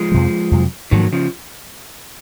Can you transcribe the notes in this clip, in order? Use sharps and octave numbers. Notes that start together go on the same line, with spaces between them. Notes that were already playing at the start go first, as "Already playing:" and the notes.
Already playing: F3 G#3
F2 C3 F#3
F2 C3 F#3
G#2 D#3 F3 F#3 A#3
C#3 F3